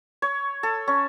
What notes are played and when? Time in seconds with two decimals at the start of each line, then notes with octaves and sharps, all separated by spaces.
0.22 C#5
0.63 A4
0.88 C#4